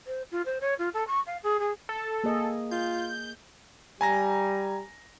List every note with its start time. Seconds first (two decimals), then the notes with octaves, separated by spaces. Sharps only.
0.06 C5
0.31 F4
0.45 C5
0.60 C#5
0.78 F4
0.93 A4
1.07 C#6
1.26 F5
1.43 G#4
1.59 G#4
1.89 A4
2.24 A#3 G#4 D#5
2.71 F4 G6
4.01 G3 G#5 A#5 A#6